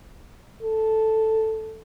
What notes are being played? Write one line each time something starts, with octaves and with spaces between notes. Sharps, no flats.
A4